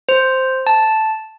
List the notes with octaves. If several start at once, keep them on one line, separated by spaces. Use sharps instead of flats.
C5
A5